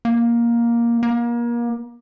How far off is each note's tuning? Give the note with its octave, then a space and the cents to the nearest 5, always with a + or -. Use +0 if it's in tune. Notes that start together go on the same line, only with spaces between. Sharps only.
A#3 +10
A#3 +30